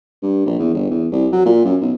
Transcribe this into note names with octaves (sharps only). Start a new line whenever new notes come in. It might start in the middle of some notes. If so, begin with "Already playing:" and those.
G2
A#1
E2
G1
E2
C2
F#3
A#2
F#2
B1